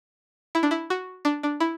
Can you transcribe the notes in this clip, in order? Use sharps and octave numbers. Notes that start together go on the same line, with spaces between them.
E4
D4
E4
F#4
D4
D4
E4